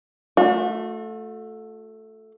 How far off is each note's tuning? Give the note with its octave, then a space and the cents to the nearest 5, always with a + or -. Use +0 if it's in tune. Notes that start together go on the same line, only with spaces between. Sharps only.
A3 +0 F#4 -45